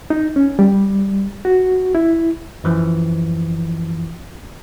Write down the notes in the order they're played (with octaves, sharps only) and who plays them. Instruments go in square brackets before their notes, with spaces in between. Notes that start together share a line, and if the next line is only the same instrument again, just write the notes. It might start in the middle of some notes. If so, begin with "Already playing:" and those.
[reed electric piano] D#4
C#4
G3
F#4
E4
[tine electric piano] F#2 E3 F3